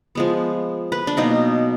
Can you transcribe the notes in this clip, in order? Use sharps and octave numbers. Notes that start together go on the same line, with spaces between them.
F3 G#3 B3
B4
D4
B2 F#3 A#3 D#4